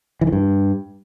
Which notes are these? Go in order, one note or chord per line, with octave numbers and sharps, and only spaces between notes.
E3
D#3
G2